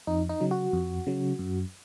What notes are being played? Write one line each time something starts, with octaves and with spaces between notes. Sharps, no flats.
F2 D#4
D#4
C#3 F#3
F#4
F2
C#3 F#3
F#2